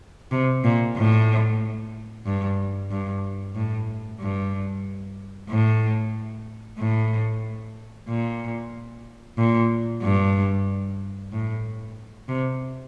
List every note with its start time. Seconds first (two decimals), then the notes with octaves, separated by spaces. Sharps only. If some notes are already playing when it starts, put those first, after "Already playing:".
0.31 C3
0.64 A#2
0.97 A2
2.25 G2
2.91 G2
3.55 A2
4.20 G2
5.50 A2
6.79 A2
8.09 A#2
9.38 A#2
10.03 G2
11.32 A2
12.28 C3